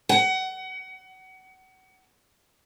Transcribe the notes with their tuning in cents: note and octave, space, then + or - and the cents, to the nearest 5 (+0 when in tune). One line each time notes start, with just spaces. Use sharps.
F#5 +30